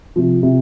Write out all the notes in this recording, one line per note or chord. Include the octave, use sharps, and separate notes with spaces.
C3 F3
C3